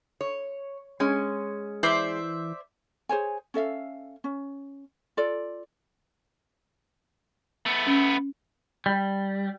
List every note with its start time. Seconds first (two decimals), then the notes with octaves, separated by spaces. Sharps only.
0.21 C#5
1.00 G#3 C#4
1.83 E3 C5 D5 E5
3.09 G#4 C5 C#5 G#5
3.54 C#4 A4 E5 F5
4.24 C#4
5.17 F4 A4 D5
7.66 A3 B3
7.87 C#4
8.86 G3